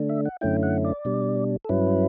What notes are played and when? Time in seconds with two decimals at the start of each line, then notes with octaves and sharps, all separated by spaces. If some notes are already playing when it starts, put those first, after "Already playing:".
Already playing: D3 A3 D4
0.09 E5
0.25 F#5
0.41 F#2 D3 A3 C#4 E4 G5
0.63 F#5
0.85 D5
1.05 B2 G3 D4
1.65 A4
1.69 G2 F#3 C#4 E4 B4